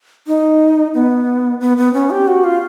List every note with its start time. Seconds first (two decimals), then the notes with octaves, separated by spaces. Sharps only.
0.27 D#4
0.94 B3
1.61 B3
1.77 B3
1.93 C#4
2.10 G4
2.28 F#4
2.44 F4